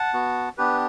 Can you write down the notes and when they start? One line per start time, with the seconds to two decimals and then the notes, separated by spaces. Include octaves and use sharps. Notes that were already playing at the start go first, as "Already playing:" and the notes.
Already playing: F#5 A5
0.13 B3 F#4
0.58 B3 D4 G4 B4